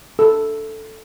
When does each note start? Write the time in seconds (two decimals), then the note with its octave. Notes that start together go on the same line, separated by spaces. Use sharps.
0.19 A4